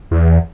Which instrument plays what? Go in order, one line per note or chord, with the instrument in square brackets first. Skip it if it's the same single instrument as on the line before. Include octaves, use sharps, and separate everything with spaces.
[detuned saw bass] E2